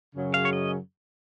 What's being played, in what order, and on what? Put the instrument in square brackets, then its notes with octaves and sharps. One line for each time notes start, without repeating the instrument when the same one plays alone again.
[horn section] F#2 C#3 F#3 C#4 G#4
[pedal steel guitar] F5
C#5
D#5